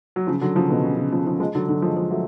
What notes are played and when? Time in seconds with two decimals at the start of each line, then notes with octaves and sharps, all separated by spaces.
0.16 F#3
0.27 C#3 F3
0.41 D3 F#3
0.56 C#3 F3
0.69 B2 D3
0.84 C#3
0.97 C#3
1.12 C#3 F3
1.27 C#3 F3
1.40 F3 G#3
1.55 D3 F#3
1.69 D3 F#3
1.82 F3 G#3
1.97 F3 G#3
2.11 F#3 A3